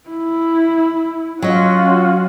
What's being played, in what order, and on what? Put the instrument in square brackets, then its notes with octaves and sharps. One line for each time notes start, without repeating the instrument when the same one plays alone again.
[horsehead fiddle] E4
[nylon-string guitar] F#3 D#5 [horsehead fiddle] C#4 F#4 [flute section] F4